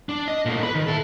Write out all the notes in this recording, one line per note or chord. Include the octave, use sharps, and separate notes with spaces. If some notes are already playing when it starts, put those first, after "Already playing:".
D4
D#5
A#2 A3
B4 B5
D#3
E4 A4